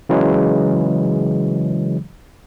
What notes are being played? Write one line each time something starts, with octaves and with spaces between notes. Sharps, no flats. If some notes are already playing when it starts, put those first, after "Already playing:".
C#3 E3 F#3 G#3